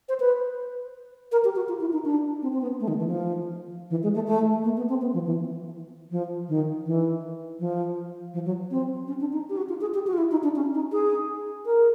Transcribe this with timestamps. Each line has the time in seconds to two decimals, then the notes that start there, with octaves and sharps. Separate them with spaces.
0.09 C5
0.20 B4
1.32 A#4
1.44 G4
1.56 F#4
1.69 F4
1.81 E4
1.93 D#4
2.05 D4
2.42 C4
2.52 C4
2.61 B3
2.80 A3
2.88 D#3
2.98 E3
3.07 F3
3.90 E3
4.03 G#3
4.15 A3
4.27 A3
4.64 A#3
4.77 B3
4.89 C4
5.02 B3
5.14 F3
5.26 E3
6.11 F3
6.49 D#3
6.86 E3
7.60 F3
8.34 F3
8.45 F#3
8.71 C4
9.08 C#4
9.20 D4
9.33 D#4
9.49 G4
9.57 F#4
9.69 F4
9.81 G#4
9.94 G4
10.07 F#4
10.13 F4
10.18 E4
10.31 D#4
10.43 D4
10.56 C#4
10.74 D#4
10.92 G#4
11.66 A#4